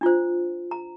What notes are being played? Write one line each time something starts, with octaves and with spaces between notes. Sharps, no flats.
D4 F4 C5
A#5